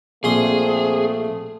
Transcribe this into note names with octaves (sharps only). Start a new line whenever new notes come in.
A#1 A3 C4 G#4 C6 D#6